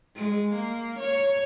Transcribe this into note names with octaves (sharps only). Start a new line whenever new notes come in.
G#3
A#3
C#5